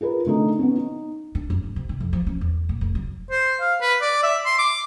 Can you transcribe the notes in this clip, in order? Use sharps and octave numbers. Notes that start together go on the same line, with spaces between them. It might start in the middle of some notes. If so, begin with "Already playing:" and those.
F4 G#4 A#4 B4
D3 A3 D#4
B3 C#4
D#4
D3
F#2
A1
C3
D#3
F2
F3
C#4
E2
A#2
F1
F#3
C5
F5
B4
D5
E5
C6
D6